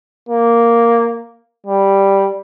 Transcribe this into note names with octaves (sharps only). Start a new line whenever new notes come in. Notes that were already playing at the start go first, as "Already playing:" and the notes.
A#3
G3